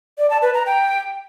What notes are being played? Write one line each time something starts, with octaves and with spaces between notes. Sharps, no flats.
D5
A5
B4
A#5
G5